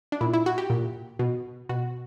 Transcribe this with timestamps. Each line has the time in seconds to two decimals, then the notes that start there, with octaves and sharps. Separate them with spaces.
0.12 D4
0.21 A#2 E4
0.34 E4
0.46 F#4
0.58 G4
0.70 A#2
1.19 B2
1.69 B2 F#4